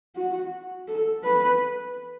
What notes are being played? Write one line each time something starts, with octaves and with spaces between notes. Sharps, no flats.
F#4
A4
B4